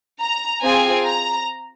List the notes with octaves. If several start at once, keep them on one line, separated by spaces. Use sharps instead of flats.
A#5
C4 F4 G#4 G#5
A#5